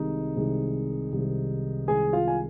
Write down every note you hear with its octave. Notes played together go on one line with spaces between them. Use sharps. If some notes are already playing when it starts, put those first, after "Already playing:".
Already playing: C2 C3 D#3 G#3 D#4 D#5
C2 C3 D#3 G#3
C2 C3 D#3 G#3
C2 C3 D#3 G#3 G#4 G#5
F4 F5
G#5